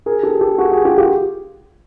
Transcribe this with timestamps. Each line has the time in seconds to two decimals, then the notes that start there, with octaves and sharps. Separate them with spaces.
0.06 G#4 A#4
0.23 G4 A4
0.41 G4 A4
0.58 F#4 G#4
0.72 F#4 G#4
0.84 F4 G4
0.98 F4 G4